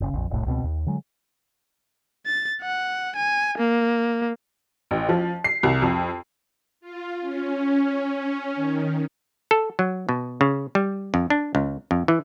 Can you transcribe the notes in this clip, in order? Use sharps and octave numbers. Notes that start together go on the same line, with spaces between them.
F#1 C#3
A#1 F2
E1 C2 A2
C#2 B2 C4
D#2
D3 F#3 G#3
A6
F#5
G#5
A#3
A1
F3
C7
C2
F2
F4
C#4
D#3
A4
F#3
B2
C#3
G3
F2
D4
C#2
F2
E3